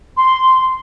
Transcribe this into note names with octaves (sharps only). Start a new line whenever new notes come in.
C6